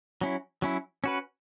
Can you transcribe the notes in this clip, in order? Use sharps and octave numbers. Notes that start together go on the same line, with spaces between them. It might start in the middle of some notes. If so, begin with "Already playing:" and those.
F#3 C#4 E4
F#3 C#4 E4
C#4 F#4 B4